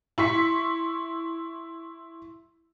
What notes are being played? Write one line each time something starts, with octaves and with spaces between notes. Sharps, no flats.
E4 C6 C#6 B6